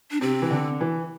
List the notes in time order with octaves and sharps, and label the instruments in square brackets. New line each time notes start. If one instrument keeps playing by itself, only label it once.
[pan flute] D4
[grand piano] C3 [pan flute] C4
[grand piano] E3
D3
E3